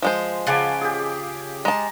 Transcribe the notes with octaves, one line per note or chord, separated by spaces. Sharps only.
F3 G#3 C5
C#3 F4 F#5 G#5 A5 D6
G4 G#4
G#3 A5 A#5